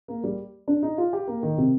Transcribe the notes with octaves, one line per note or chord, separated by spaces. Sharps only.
A#3
G3
D4
D#4
F4
G4
A#3
D#3
C3